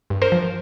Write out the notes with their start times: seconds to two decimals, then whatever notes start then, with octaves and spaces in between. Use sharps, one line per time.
0.10 G2
0.22 A#4 C5
0.32 F3